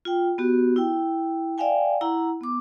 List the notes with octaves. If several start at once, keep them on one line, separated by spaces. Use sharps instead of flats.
F4 G5
B3 F#4 G4
E4 G5
D5 E5 F5 G5 G#5
E4 F#5 A#5
B3 D6